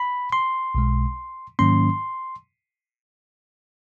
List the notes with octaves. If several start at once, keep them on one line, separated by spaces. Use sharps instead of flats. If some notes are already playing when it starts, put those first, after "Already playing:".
Already playing: B5
C6
B1 B2 G#3
G#2 D#3 F#3 A#3 C#4 C6